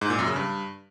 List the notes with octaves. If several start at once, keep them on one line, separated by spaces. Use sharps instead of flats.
G#2
A#2
F#2
C#3
G2